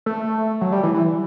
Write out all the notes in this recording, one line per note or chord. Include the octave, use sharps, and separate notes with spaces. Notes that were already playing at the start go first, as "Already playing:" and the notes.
A3
F#3
G3
E3
E3